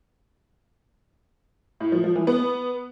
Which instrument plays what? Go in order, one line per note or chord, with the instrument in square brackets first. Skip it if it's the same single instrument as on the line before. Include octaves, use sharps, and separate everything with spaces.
[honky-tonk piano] A2
F3
F3
E3
B3